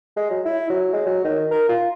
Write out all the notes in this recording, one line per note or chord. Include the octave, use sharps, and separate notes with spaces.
G#3
F#3
E4
F#3
G#3
F#3
D#3
A#4
F4